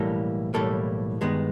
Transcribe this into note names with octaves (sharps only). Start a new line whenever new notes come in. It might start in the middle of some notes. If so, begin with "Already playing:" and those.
Already playing: B1 A2 E3 G3 A#3 A4
B1 A2 E3 G3 A#3 A4
G2 D#3 G#3 B3